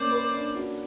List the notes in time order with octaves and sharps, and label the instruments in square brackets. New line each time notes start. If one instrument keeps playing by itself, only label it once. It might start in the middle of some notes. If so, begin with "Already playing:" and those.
Already playing: [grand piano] A#3 C#4 [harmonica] C5 D5
[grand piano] B4
D4
F#4